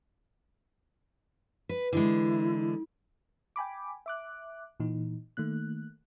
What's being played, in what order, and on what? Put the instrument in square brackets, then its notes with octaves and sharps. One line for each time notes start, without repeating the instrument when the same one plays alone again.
[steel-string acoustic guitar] B4
[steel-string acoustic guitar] D3 E3 G#3 [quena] E4
[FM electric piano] G5 G#5 B5 D6
E5 D6 F#6
A#2 E3 D#4
D#3 A3 A#3 F#6